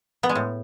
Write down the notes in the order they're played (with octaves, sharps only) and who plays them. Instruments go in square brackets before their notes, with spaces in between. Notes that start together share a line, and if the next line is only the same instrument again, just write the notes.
[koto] B3
G#3
A2